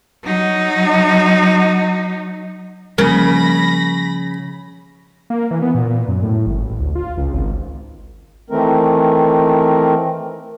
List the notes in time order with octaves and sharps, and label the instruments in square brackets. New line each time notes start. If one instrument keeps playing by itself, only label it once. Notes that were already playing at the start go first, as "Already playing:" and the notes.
[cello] F#3 D#4
[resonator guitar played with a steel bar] C#3 [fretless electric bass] F3 G3 A#3 [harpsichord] A#4 [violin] B5 A#6
[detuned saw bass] A#3
E3
B3
A#2
F#2
A2
G#1
A1
D2
F4
C#2
G#1
[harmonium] D#3 E3 A3 C4 A#4